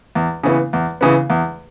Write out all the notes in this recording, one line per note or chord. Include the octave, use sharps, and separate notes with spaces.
E2
C#3 E3 B3
E2
C#3 E3 B3
E2